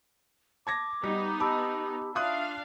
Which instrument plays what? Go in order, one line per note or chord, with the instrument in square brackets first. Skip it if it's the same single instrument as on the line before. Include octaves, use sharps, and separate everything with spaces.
[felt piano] A5 G#6 A#6 [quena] D6
[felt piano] G3 [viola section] B3 D#4
[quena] G4 [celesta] A5 B5 E6 [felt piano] D6
[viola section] D4 F5 [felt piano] F4 D#6 F#6 [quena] E5